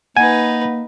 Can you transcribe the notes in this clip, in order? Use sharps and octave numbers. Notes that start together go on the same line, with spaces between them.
A#3 D#4 B4 F#5 G#5